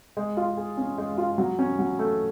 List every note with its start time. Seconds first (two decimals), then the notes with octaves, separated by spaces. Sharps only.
0.17 G#3
0.37 F4
0.57 G#4
0.77 C#4
0.98 G#3
1.18 F4
1.38 F#3
1.59 C#4
1.79 F#3
1.99 A3